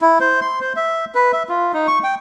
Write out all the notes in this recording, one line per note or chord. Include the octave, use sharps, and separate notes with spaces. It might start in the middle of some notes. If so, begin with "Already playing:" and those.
E4
C5
C6
C5
E5
B4
E5
F4
D#4
C#6
G5